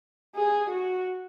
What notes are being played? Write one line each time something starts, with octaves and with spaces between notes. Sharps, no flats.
G#4
F#4